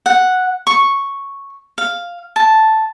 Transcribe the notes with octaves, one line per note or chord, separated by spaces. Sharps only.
F#5
C#6
F5
A5